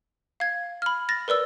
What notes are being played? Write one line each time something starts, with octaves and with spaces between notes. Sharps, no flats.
F5 G#6
B5 F6
A6 A#6
A#4 B4 D5 E6